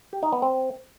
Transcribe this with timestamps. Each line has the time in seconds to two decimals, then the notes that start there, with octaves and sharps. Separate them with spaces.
0.13 G4
0.23 D#4
0.32 B3
0.42 C4